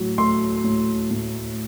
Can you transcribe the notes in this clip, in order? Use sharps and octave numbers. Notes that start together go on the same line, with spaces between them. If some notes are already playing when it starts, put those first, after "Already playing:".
Already playing: A2 F#3
A3 C6
A2
A2